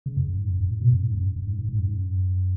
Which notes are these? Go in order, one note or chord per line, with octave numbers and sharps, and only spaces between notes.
C#3
F#2
F#2
G#2
F#2
F#2
A2
B2
F#2
G#2
F#2
F#2
G#2
G#2
G#2
F#2
G#2
F#2